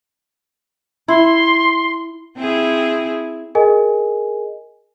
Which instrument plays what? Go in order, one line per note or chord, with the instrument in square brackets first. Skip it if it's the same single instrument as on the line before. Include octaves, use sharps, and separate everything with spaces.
[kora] E4 [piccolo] C6
[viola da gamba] C4 E4 G#4
[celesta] G#4 A#4 D#5 G#5